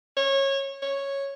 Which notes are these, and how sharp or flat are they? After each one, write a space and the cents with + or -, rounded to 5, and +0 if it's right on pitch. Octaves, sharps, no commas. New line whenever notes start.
C#5 -20
C#5 -5